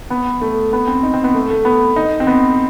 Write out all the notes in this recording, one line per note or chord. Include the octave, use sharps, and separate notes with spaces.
B3
A3
B3
C4
D#4
C4
B3
A3
A3
B3
D#4
C4
B3